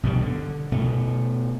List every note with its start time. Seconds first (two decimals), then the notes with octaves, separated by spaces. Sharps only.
0.03 B2 D#3 E3 G3
0.21 D3
0.72 B2 A3